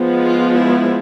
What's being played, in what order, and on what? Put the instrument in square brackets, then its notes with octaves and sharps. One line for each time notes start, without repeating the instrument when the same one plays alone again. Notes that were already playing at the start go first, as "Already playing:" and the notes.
Already playing: [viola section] F3 G#3 B3
F4
E4